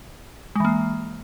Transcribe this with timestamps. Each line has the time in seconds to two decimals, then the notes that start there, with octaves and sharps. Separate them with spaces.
0.56 G#3
0.60 E3
0.65 A#3